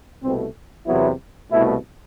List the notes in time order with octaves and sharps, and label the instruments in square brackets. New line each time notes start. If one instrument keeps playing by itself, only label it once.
[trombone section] C2 B2 A3 C4
E2 C3 F#3 B3 E4
C2 B2 A3 E4